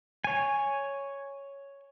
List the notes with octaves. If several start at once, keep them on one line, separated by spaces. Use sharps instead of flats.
C#5 G#5